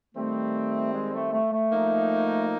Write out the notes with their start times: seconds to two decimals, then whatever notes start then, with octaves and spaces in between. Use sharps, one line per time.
0.15 D#3 G3 A3 C4
0.93 G#3
1.13 A3
1.32 A3
1.52 A3
1.72 F3 A#3 D#4